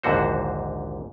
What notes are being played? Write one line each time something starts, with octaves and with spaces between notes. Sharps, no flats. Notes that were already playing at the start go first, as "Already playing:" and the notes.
A#1 D#2 G#2 D3 F#4 C5